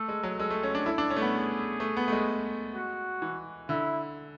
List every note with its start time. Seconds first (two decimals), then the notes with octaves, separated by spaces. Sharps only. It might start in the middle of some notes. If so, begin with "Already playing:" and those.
Already playing: A3 A4
0.08 G#3
0.23 F#3
0.39 G#3 A4
0.50 A3
0.63 C#4
0.75 D4
0.86 E4 A4
0.98 D4
1.10 C#4
1.17 A3
1.22 B3
1.33 G#4
1.80 A3
1.97 B3
2.08 A3
2.12 G#3
2.74 F#4
3.22 E3
3.69 D3 E4